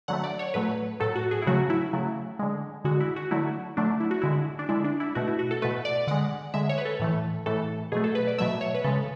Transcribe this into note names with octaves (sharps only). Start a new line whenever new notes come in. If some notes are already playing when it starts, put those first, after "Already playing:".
D3 F#3 A3 F#5
D5
C#5
A2 F#3 A3 B4
A2 F#3 A3 A4
F#4
G#4
E4
C#3 F#3 A3 F#4
E4
C#3 F#3 A3
D3 G#3
D3 G#3 F#4
E4
F#4
D3 F#3 A3 E4
D3 F#3 A3 D4
E4
F#4
D3 G#3 E4
D4
D3 G#3 E4
D4
E4
B2 A3 F#4
E4
F#4
A4
B2 A3 B4
D5
D3 G#3 F#5
D3 G#3 E5
C#5
B4
A4
A2 E3 A3
A2 E3 A3 A4
B2 F#3 A3 G#4
A4
B4
D5
B2 F#3 A3 E5
C#5
B4
C#3 G#3 A4